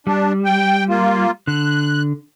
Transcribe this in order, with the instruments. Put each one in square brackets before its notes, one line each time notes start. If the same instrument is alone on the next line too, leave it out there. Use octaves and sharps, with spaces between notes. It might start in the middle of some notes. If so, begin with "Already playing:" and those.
[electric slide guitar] G3 [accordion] D4
[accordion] G5
A#3 F4
[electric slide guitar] D3 [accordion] F#6